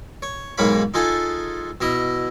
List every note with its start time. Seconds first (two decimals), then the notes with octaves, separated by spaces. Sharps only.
0.22 C#5
0.58 B1 G#2 A#3 C#5 F5 B5
0.94 D#4 F4 G#4 A4
1.81 B2 E4 D#5